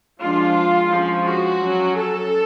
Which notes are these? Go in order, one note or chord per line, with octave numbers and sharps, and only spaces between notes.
F3 G#3 D4 F4
F3 G#3 C#4
F#4
F#3 C#4
A4